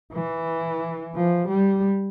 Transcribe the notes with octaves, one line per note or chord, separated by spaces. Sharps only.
E3
F3
G3